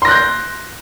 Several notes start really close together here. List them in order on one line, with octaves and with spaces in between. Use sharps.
C6 A#6 F#6 G6